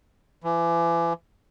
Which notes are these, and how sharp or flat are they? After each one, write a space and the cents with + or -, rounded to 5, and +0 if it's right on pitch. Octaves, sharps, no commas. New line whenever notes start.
E3 +35